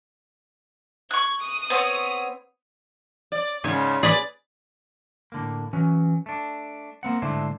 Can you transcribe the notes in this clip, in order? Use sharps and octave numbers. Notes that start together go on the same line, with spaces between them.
C#6 F#6 G#6
D#6
B3 C4 C#5
D5
G#2 C#3 G#5
G#4 B4 D5
A2 D3 A#3
E3 F#3 C#4
A3 D4
A#3 C4 F#5
G#2 D3 A3 D4 E4 C5